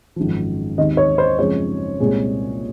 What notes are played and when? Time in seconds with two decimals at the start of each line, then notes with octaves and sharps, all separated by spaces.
0.16 G#1 F#2 F3
0.78 D#2 D#3 G#3 C4 D#5
0.97 C#5
1.18 C5
1.38 F#2 C#3 F3 G#3 C4 C#5
2.00 C2 A#2 G#3 C4